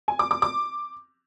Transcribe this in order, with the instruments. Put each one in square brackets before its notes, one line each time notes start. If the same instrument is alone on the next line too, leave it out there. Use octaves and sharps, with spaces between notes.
[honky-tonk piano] G#5
D6
D6
D6